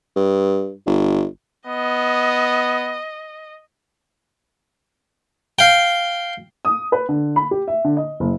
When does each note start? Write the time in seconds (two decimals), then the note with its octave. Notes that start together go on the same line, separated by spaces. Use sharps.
0.16 G2
0.86 G1
1.67 B3 D#5
5.59 F5 G5
6.65 D#6
6.92 B4
7.09 D3
7.36 B5
7.51 G4
7.68 E5
7.84 D3
7.97 D#5
8.20 F#1